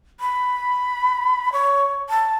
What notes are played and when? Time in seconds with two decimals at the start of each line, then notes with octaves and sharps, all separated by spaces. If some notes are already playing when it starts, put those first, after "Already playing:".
0.20 B5
1.53 C#5
2.10 A5